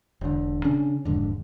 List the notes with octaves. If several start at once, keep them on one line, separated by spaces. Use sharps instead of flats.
E1 D3
C#3 C#4 D4
E1 F2 G#2 D3